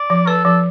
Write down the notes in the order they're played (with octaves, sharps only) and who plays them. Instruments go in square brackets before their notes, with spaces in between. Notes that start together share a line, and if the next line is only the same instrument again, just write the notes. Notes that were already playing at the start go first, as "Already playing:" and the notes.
Already playing: [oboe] D5
[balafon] F3
[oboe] A4 [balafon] B4
[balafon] F3 [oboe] A4